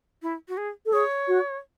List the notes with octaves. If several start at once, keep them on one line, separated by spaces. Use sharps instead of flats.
E4
F#4
G#4
A4
G#4 C#5
F#4